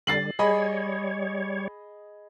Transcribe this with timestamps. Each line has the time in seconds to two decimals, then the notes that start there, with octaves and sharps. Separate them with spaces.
0.07 D3 G3 A6 C7 F#7
0.39 G3 G#4 C#5 D#5 B5